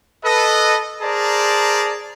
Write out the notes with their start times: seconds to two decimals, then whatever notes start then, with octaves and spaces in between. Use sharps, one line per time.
0.24 A4 B4 D#5
1.02 G#4 A#4 C5 D5 A5 A#5